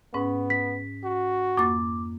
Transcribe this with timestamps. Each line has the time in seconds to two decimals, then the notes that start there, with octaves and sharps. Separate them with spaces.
0.14 G#2 B3 C#4
0.50 B6
1.04 F#4
1.57 F2 A#3 D6 A6